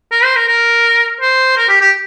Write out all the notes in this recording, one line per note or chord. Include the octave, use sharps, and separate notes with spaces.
A#4
C5
A#4
A#4
C5
A#4
G4
G4